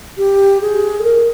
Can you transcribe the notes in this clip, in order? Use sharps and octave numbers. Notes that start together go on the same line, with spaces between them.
G4
G#4
A4
A#4